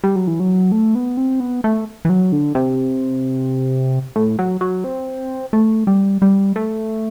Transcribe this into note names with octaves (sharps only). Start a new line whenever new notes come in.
G3
F#3
E3
F#3
A3
B3
C4
B3
A3
E3
F#3
D3
C3
A2
F#3
F#3
C4
A3
G3
G3
A3